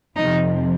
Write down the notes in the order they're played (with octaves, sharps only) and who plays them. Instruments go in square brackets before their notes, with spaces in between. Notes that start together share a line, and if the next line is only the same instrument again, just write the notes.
[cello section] F2 C3 F3 D#4